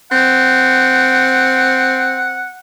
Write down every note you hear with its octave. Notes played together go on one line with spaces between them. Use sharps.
C4 F#5